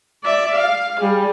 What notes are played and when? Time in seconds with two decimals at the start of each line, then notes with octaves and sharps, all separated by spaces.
0.24 D5 E5
0.55 F5
1.00 G3 G#4